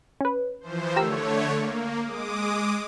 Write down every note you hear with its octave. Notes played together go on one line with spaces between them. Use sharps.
C#4 B4
E3 F3 C5
D3 A3 G4 A#4 C#5 E6
A#3
G#3 D6 D#6